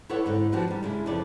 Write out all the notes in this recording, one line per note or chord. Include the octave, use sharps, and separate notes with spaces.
E4 A4 B4 C#5 D5 F#5
G#2 D3 C4
F3 D4 F#4 G4 B4
D#3 G3
C#3 G#3 D4 E4
F2 C#3 E3 A4 D5